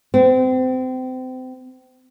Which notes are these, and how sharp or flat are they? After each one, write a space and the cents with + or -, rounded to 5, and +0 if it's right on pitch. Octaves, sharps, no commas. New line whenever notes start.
C4 -30